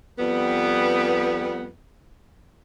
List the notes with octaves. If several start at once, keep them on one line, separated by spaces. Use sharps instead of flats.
F2 G3 B3